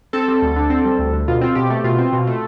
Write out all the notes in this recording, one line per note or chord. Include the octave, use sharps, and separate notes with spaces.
C4 A4
G3
D2
D3
C4
G3
D2
D3
B2 F4
C4 F4
B2 G4
A3
B2 F4
C4
B2
A3